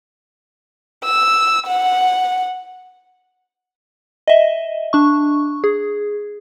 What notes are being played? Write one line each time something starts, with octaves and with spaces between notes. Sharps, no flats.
E6
F#5
D#5 E5
D4 C#6
G#4